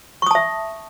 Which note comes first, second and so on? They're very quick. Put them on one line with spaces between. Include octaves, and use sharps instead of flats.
C#6 D#6 A5 E5